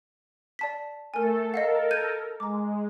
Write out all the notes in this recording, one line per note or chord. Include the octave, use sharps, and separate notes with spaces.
D5 A5 B6
A3 A4 A#4 G#5
A4 A#4 D#5 F5 F#5
G6 G#6 D#7
G#3 A#5 D6